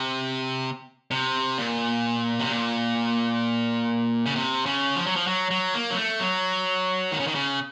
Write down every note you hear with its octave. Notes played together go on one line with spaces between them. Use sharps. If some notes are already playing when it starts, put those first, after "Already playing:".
Already playing: C3
C3
A#2
C3
A#2
C#3
C3
C#3
F3
F#3
F3
F#3
F#3
A#3
F#3
A3
F#3
D#3
C#3
D#3
C#3